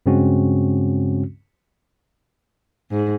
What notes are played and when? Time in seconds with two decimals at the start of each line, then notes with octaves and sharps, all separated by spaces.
0.06 G2 C#3 G#3 C4 C#4 F#4
2.91 G#2